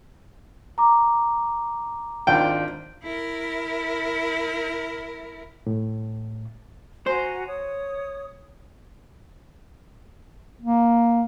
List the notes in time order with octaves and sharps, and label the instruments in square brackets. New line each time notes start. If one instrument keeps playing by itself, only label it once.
[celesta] A#5 D6
[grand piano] G#1 D4 F4 [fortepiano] G5
[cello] E4 A#4
[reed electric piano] A2
[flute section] F#4 G#5 A#5 [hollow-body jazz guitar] C5
[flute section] C#5 D#6
[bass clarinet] A#3